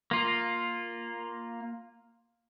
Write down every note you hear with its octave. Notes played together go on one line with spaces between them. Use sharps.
A#3 F4